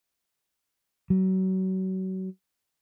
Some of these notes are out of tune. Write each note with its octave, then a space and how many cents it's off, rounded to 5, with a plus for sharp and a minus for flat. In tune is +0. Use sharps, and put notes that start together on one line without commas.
F#3 +30